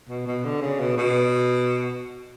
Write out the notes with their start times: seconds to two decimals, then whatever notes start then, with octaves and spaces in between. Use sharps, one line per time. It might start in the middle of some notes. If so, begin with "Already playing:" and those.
0.09 B2
0.26 B2
0.44 D3
0.61 C#3
0.80 B2
0.97 B2